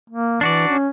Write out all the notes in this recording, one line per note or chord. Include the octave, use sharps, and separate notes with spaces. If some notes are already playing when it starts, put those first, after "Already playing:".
A#3
E3 D4 F#4 D5
C#4